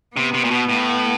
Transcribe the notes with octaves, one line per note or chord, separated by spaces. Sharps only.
C3 B3
C3
A#2
B2
A2